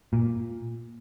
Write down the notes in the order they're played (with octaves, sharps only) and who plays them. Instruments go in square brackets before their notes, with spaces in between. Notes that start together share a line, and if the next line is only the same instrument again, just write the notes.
[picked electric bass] A#2